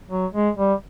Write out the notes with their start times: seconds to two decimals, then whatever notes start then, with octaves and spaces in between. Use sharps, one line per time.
0.10 F#3
0.34 G#3
0.57 G3